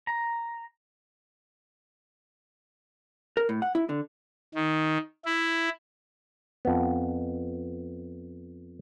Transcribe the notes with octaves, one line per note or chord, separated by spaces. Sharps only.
A#5
A#4
A2
F#5
E4
D3
D#3
E4
F2 B3